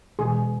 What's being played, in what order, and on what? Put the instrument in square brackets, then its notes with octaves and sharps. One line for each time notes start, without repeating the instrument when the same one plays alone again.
[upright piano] E1 [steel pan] G#4